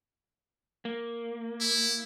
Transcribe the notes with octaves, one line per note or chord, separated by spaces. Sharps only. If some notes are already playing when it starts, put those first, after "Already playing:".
A#3
E4